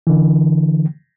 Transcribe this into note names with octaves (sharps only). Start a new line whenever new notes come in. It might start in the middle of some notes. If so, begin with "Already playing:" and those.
D3 E3